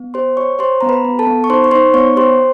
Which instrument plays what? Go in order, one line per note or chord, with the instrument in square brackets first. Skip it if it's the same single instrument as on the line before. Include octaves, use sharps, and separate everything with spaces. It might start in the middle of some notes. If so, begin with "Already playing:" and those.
Already playing: [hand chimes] B3
G4 C5 C6
G4 C#5 C#6
G4 C5 C6
B3 A#5
B4 B5
B3
A4 A5
B3
C#6
D#4 C5 C6
C#6
D#4 C5 C6
B3 C#5 C#6
G4 C5 C6